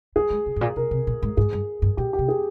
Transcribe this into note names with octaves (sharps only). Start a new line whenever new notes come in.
G3 G#4
G#3
C#3
G#2
A#2
C3 A#4
C3
A#2
G#2
G#2 G#4
G2
G2
A#2 G4
G4
C3
G#4